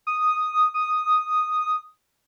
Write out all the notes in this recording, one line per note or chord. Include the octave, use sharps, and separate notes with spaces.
D#6
D#6